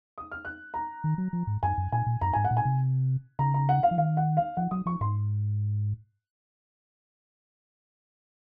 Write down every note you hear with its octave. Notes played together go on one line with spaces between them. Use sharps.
D#6
F6
F#6
A#5
D#3
F#3
F3
G#2
F#2 G#5
F#2
A#2 G#5
A#2
F#2 A#5
G#2 G#5
F#5
A#2
G#5
C3
C#3 A#5
A#5
F#5
F5
F3
D#3 F5
F#5
F5
F3 F#5
F#3 D#6
F3 C#6
G#2 C6